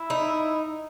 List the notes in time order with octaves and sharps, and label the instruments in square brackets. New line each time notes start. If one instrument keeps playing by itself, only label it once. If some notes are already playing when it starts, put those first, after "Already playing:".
Already playing: [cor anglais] E4
[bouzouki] D#4